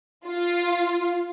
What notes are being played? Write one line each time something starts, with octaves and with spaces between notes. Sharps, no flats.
F4